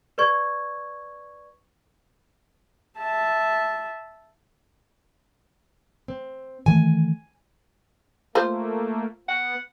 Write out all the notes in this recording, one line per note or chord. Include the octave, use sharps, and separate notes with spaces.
B4 D5 C#6 G#6
E5 A5
C4
D#3 E3 A3 G#5
A3 A#3 F4 C5
B3 F#5